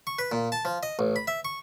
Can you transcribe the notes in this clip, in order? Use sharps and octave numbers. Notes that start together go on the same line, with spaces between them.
C#6
B4
A#2
A5
F3
D#5
A1
B5
E5
C#6